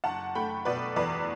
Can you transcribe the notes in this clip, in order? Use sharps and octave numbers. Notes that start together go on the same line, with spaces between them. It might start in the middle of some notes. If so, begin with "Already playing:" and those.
F#1 F#5 A5
A3 G5 B5
B2 B4 D5
E2 B4 D5